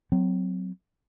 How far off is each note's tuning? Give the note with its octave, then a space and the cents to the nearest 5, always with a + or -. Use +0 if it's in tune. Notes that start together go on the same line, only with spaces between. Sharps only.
F#3 +0 C4 -25